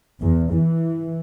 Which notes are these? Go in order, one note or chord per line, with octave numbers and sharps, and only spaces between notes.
E2
E3